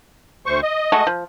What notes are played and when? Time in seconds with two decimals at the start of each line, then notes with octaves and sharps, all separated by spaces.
0.46 D2 C5 C#6
0.63 D#5
0.92 G#3 A3 F#4
1.07 F3